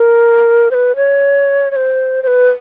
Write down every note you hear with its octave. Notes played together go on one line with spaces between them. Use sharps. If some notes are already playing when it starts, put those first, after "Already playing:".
Already playing: A#4
C5
B4
C#5
C#5
C5
C5
B4